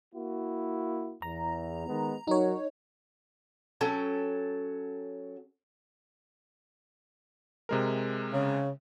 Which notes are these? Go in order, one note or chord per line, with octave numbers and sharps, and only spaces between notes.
A#3 E4 F#4
E2 A#5
D#3 G#3 B3
F#3 D#4 F#4 A#4 C#5
F#3 C#4 A4 G5
C3 G#3 A#4
C#3